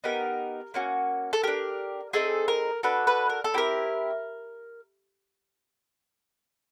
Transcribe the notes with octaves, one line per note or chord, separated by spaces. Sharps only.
B3 D#4 G4 A#4
A#3 C#4 F#4
A4
D4 G4 A#4
C4 D#4 G#4 A4
A#4
D4 F#4 A4 B4
B4
A#4
A4
C4 E4 G4 A#4